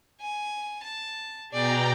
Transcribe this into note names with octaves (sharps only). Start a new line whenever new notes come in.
G#5
A5
B2 G#4 D5 G5 A#5